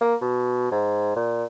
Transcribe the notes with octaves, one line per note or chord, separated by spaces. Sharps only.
A#3
B2
G#2
A#2